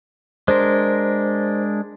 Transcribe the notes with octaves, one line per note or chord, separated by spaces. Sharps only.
G#3 D4 A#4 C5